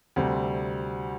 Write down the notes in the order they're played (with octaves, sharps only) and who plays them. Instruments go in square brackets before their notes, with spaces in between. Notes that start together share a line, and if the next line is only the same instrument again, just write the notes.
[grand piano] D2 C3 G3 C4